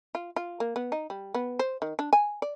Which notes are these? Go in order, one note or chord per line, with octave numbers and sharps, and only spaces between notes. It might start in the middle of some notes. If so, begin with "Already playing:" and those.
F4
F4
A#3
B3
D#4
G3
B3
C5
D#3
D4
G#5
D5